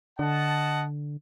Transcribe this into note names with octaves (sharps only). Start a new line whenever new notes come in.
D3 D#5 F#5 A5